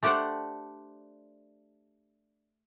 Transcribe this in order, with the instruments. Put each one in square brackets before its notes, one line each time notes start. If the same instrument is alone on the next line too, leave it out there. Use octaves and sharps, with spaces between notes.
[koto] A3 D4 G4 C5 D5 F#5